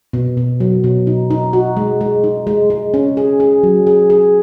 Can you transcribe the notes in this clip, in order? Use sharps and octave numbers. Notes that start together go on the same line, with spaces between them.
B2
B2
F#3
B2
D#4
D#4
F#4
G#3
G#3
D#4
G#3
G#3
C#4
G#4
G#4
F#3
G#4
G#4